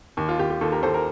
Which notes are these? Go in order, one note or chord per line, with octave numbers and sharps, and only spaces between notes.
D#2
F4
D#2 G4
G4
D#2 F4 A4
G4 A#4
D#2 A4 C5
G4 A#4